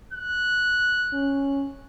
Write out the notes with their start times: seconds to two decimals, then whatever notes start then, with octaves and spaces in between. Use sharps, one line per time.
0.13 F#6
1.12 C#4